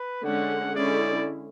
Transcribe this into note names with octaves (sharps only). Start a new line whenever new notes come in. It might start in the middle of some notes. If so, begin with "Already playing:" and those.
Already playing: B4
D3 G#3 C#4 F#5
D3 G#3 C#4 E4 G#4 D5